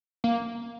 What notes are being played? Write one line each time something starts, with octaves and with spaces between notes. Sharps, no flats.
A#3